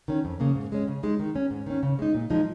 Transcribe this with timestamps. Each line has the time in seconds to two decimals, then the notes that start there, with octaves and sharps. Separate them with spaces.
0.08 D#3 C#4
0.25 F2
0.40 C#3 A#3
0.55 G#2
0.72 G#3 C#4
0.88 C#3
1.03 G#3 D#4
1.19 D#3
1.36 C#4
1.51 G#2
1.66 D#3 C#4
1.83 C#3
1.99 G#3 D#4
2.15 A#2
2.30 F3 G#3 D#4